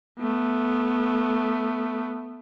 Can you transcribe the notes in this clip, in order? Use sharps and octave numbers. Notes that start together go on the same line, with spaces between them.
A3 B3